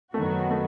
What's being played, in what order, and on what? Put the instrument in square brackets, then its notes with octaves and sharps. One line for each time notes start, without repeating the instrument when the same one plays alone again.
[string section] F#2 D#3 F#3 B3 F#4 [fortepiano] A3
[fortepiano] A3